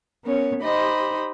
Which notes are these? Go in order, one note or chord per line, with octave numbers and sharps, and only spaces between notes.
B3 C#4 A#4 C#5
D#4 G4 C5 D#5 B5